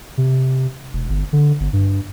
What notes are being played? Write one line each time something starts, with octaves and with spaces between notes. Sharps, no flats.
C3
E1
G1
D3
G1
G2